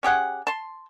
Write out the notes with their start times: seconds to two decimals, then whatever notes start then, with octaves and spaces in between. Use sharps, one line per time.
0.03 C#4 G4 G#4 F#5
0.47 A5 C6